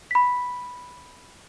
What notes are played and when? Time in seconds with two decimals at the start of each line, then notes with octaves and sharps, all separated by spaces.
0.11 B5 B6